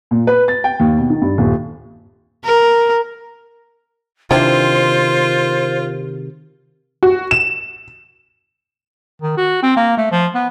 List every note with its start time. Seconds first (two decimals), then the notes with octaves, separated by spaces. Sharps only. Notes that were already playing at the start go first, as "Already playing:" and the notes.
0.11 A#2
0.27 B4
0.48 A6
0.64 G5
0.80 D#2
0.98 B2
1.10 D#3
1.22 G2
1.38 D#1
2.45 A#4
4.31 C3 D#3 E3 C4 D4 F4 C5
7.03 F#4
7.31 E7
9.22 D#3
9.37 F#4
9.63 C4
9.77 A#3
9.97 A3
10.11 F3
10.35 B3